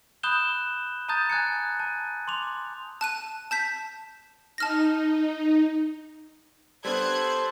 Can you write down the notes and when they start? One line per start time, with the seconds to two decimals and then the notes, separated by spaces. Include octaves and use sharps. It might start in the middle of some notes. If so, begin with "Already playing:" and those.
0.23 B5 D#6 F#6 G6 E7 G7
1.09 A5 A#5 D#6 G6 A6
1.30 G#5 F#6 G#6 C#7
1.80 A5
2.28 C6 D6 F7
3.01 A5 F#6 D#7
3.51 A5 G6 B6
4.58 D#4 A5 F6 A#6
6.85 G3 B3 D4 A4 C5 F#6 G#6